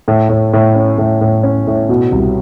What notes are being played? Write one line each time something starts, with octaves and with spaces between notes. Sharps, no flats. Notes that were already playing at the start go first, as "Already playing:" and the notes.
A2
A2
A2
C#4
A2
A2
C#4
A2
B2
C2